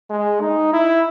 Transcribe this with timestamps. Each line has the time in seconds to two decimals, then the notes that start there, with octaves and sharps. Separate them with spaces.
0.10 G#3
0.41 D#4
0.73 E4